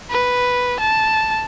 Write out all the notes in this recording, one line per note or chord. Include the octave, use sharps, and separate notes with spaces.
B4
A5